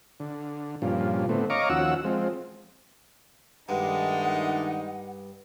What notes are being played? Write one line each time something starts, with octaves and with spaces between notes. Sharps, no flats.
D3
G2 A#2 C#3 F3
A2 D3 A3 B3 C4
C#5 D#5 F5 A#5 C#6 D6
D#2 F3 C#4 F#4 F#5 E6
F3 G#3 C4
G2 D#3 G#3 A3 D4 D#4 F#5